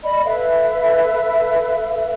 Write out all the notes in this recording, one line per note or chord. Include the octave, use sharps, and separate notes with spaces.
D5 D#5 B5
A4 B4 E5 F5